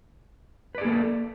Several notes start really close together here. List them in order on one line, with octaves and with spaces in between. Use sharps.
B4 D5 G#4 A#3 A4